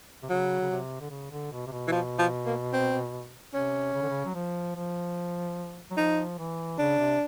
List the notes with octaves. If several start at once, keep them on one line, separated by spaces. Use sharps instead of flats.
C3
C#3 F#3
C#3
C3
D3
C#3
D3
B2
C3
B2
E3
F3
F3
A#3
C4
C3 C#4
C#3
D3
C#3
F#3
F3
F3
F#3
F3 D#4
E3
C#3 D4
C3